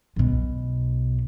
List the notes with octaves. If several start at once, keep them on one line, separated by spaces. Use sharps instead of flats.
B1 B2